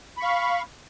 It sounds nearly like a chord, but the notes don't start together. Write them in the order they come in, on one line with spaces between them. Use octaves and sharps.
B5 C#6 F5